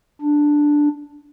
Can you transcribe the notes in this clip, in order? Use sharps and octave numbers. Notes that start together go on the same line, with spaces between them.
D4